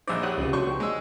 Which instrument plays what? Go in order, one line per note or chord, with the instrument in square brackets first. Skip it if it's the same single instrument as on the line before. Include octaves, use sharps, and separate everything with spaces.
[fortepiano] A#1 D#4 [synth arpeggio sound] C5 [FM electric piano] D5 E5 F#5
[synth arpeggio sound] G4 C#5 F#5 [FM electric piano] D#6 F#6
[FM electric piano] C#2 C3
[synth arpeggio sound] C#3 G6 [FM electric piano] F#3 D4 C5 [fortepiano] C#6
[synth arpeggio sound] B3 G5
[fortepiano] G#3 E6